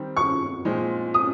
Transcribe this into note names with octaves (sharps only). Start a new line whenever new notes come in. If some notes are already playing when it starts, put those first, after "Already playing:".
Already playing: D#3 G3 C4
C#6
A#2 F3 G#3 C4 D#4
D#6